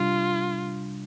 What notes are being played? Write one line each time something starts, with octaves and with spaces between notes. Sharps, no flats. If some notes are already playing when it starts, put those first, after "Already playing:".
Already playing: C3 G3 D4 F4